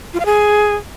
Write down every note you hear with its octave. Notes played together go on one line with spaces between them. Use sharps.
F4
F5
G#4